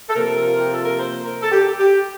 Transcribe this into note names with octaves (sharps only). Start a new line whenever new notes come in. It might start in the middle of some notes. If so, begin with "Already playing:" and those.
A4
C3 F3 A#3 A#4
F4
G4
A4
A#4
C5
A#4
A4
G4
G4